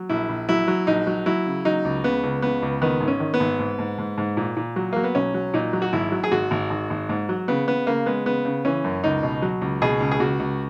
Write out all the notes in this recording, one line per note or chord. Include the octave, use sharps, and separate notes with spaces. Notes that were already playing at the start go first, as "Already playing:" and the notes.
Already playing: F#3
A#1 E4
A#1
F#3 E4
F#3
A#1 D#4
F#3
F#3 E4
C#3
F#3 D#4
C#2
C#3 B3
C#2
C#3 B3
C#2
D#3 B3
G#1
C#4
D#3
B3
G#1
G#2
G#2
G#2
G#2
A#2
A#2
F#3
F#3 A#3
B3
B1 C#4
F#3
A#2 D#4
F#3
F#4
G#1 E4
F#3
G#4
G#1 F#4
G#1
G#1
G#1
G#2
F#3
C#3 B3
C#3 B3
C#3 A#3
G#3 B3
C#3 B3
C#3
E3 C#4
F#2
C#2 D#4
B2
F#3
C#2
B2 G#4
C#2
G#4
C#2 F#4
C#2